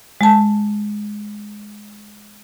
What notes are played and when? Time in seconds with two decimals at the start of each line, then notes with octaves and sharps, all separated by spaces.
0.21 G#3 A5